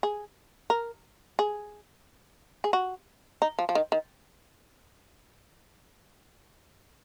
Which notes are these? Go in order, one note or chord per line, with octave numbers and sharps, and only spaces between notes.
G#4
A#4
G#4
G#4
F#4
D#4
F3
F3
D#3
D#3